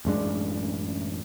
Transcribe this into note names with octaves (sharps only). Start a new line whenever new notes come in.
A1 F#2 G#3 D4